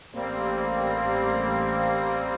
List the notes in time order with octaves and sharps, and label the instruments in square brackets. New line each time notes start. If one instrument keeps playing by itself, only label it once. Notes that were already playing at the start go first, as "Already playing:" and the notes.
[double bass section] A1 [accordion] G3 A#3 C4